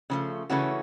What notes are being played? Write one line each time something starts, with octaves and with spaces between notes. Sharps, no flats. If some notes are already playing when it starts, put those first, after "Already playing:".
C#3 F3 A3
C#3 E3 A3 C#4 F#4